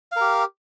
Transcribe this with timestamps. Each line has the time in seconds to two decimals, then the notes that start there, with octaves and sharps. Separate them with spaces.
0.12 F5
0.16 A#4
0.21 G4